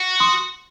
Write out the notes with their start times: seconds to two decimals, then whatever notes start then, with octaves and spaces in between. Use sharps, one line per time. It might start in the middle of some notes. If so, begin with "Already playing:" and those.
Already playing: F#4
0.20 C6 D#6